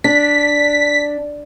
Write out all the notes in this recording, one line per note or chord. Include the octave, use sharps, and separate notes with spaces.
D4 B6